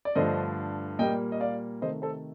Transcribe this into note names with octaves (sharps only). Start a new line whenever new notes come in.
D5
G2 D3 F3 A3 C5 D#5
A#2 G3 A#3 D#5 G5
D#5
D5 F5
C3 D#3 A3 C5 D#5
A4 C5